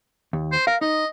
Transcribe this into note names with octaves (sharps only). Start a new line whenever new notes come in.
D#2
C5
A#4 F5
D#4 D#5